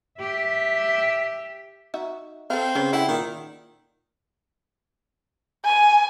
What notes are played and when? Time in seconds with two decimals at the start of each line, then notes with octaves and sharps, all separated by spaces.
0.20 G4 E5
1.94 D#4 F#4 E5
2.50 C4 A4 C5 F5
2.75 C#3 C#4 B4 C5
2.93 D3 E4 F#5 G5
3.08 A#2 D#3
5.65 G#5